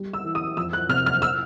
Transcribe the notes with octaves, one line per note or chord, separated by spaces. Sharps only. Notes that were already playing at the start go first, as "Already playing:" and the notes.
Already playing: G3
E6
E3
D#6
F2 E6
F#6
C3 F6
F6
E6